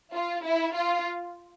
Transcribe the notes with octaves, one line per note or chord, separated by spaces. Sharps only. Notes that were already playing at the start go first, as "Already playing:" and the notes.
F4
E4
F4